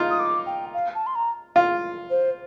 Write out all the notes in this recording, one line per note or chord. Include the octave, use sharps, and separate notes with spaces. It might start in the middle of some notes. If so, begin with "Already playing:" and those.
Already playing: D#4 F4
D#6
D6
G5
F5
A5
C6
A#5
F4 F5
C5